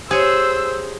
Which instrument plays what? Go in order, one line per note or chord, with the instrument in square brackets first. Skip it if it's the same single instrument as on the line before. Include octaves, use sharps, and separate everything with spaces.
[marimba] G4 C#5 [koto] G#4 [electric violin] C5 [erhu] E6